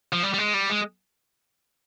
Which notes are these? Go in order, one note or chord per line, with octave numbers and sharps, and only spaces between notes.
F3
G3
G3
G#3
G3
G#3